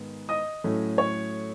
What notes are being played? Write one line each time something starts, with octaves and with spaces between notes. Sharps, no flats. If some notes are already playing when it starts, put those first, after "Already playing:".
Already playing: G#2 D#3 B3
D#5 D#6
A2 F#3 A3 C#4
C#5 C#6